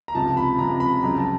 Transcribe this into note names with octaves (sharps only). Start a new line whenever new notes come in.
A#5
C#2 C3 F3 A5
B5
C#2 C3 F3 A#5
B5
C#2 C#3 F#3 A#5
A5